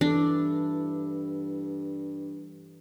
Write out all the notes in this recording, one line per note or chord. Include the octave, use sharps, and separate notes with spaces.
G2 E3 D4 A4